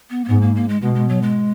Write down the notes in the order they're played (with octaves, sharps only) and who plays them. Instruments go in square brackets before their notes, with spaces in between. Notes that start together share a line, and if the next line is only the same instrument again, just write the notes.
[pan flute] B3
A#3
[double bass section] G#2 [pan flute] B3
[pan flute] A#3
A#3
G#3
[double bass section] B2 [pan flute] G#3
[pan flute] G#3
F#3
G#3